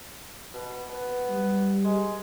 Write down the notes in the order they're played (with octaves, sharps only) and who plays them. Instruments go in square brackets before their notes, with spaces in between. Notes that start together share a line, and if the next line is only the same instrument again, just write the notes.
[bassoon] B2
B3
[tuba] G3
[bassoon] G#3